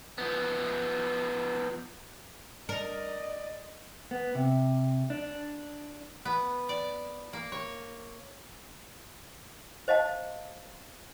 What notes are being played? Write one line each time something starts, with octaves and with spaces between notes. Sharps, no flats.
F3 B3
A#4 D5 D#5
B3
C3
D4
B3
D5
A#3
C#5
C5 D#5 F5 A5